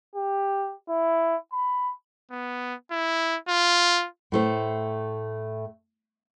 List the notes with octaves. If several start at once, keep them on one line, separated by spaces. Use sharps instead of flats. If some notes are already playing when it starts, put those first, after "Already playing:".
G4
E4
B5
B3
E4
F4
A2 A3 C5